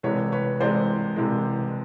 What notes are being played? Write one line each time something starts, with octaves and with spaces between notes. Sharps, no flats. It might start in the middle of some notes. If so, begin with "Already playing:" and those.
C2 C3 E3 G#3 B4 C#5
B4 C#5
C2 C3 E3 G#3 C5 D5
C2 C3 E3 G#3